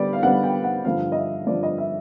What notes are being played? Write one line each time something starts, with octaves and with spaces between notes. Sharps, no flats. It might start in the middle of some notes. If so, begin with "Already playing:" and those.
Already playing: D3 G3 B3 D5
F5
D3 G3 B3 F#5
G5
F#5
G2 D3 F3 F5
D#5
E5
G2 D3 F3 D5
D#5
E5